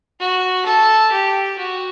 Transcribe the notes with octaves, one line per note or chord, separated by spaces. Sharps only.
F#4
A4
G4
F#4